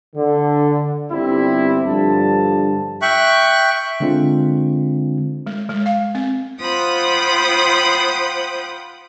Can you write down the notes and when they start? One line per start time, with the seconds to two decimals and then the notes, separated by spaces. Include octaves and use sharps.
0.16 D3
1.11 G1 G3 C4 E4
1.85 G2 D3 F3 A5
3.02 E5 G5 C#6 F#6
4.00 D3 G#3 C4 D4 F4
5.47 G#3
5.69 G#3
5.86 F5
6.15 C4
6.60 F4 C5 F#5 G5 B5 D#6